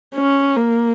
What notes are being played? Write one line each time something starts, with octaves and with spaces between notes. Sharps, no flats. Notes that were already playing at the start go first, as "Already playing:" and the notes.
C#4
A#3